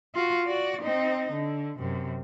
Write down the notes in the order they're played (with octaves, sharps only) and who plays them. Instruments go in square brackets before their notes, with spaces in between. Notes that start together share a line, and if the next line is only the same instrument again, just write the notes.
[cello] F4 F#4
F#4 D5
C4 D#4
D3
F#2 C3